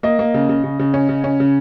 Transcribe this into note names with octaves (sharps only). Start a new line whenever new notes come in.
A#3 D#5
A#3
C#3
C#3
C#3
C#3
C#4
C#3
C#4
C#3